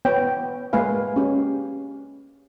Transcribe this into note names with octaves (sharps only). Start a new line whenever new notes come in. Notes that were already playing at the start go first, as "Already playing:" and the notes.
B3 C#5 G5
G#3 A#3 B4 F5 G#5
C#4 G4